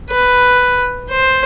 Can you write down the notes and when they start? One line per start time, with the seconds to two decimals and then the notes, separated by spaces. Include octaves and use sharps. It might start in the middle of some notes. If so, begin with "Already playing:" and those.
0.10 B4
1.10 C5